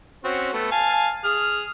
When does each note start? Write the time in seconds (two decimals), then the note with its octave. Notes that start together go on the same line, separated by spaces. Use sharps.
0.24 C4 C#4 F#4
0.53 A3 B3
0.72 F5 G#5 A5
1.24 G#4 F6